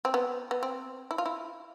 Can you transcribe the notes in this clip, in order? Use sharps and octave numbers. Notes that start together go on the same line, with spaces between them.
C4
B3
B3
C4
E4
F4
E4